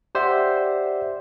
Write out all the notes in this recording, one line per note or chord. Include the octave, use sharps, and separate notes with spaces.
G4 C5 D5 E5 F#5